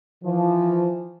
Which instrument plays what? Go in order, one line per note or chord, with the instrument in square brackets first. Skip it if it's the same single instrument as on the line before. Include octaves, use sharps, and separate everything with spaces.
[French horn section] E3 F3